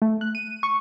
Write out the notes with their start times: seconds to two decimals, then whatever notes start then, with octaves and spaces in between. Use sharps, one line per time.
0.02 A3
0.21 F#6
0.35 D#7
0.63 C#6